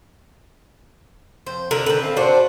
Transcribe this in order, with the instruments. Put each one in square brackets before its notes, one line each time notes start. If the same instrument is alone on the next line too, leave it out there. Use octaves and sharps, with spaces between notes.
[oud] F2 [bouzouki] C5
[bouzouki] D3 A#4
[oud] D3 D#3 C#4 [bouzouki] C4 B4
[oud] F5
[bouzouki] D4 F#4 [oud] C5